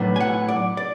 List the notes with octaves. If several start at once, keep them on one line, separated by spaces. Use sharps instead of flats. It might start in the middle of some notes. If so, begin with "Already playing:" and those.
Already playing: A2 F#3 B3 D4
G#5
F#5
D5
D5